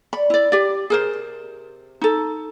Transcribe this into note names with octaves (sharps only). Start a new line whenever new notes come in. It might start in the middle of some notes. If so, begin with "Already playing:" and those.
C#5 D5 B5
D4 E4 B4 D5
G4 D5
C3 B3 G#4 A#4 C5 G5
C3
D#4 A4